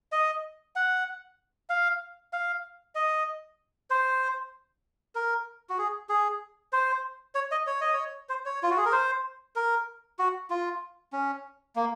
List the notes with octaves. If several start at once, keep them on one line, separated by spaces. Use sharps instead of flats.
D#5
F#5
F5
F5
D#5
C5
A#4
F#4
G#4
G#4
C5
C#5
D#5
C#5
D#5
C#5
C5
C#5
F4
F#4
G#4
A#4
C5
A#4
F#4
F4
C#4
A#3